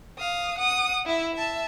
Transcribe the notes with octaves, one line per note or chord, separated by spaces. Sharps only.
F5 D#6
F#5 D#6
E4 E5
E5 A5